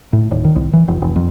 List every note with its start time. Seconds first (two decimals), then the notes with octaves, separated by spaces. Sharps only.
0.13 A2
0.31 D#1
0.45 D#3
0.56 C2
0.73 E3
0.88 F1
1.02 F1
1.16 F2